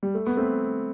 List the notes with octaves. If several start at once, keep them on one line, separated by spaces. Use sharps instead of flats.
G3
A3
B3
A3 C4